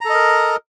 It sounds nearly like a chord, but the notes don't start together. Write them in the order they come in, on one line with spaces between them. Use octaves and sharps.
A#5 A4 D#5 A#4